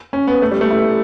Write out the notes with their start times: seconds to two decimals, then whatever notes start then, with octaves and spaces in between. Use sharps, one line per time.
0.13 C#4
0.28 B3
0.42 A3
0.51 G3
0.61 A3
0.70 E4